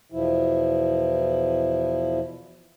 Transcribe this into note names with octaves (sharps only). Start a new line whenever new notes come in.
E2 B2 F3 E4